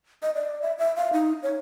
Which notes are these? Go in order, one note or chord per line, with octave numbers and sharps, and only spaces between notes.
D#5
D5
E5
E5
F5
D#4
C#5